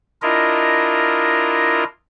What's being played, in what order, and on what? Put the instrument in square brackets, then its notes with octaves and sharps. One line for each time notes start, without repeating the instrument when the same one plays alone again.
[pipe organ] D4 E4 F4 A#4 D#5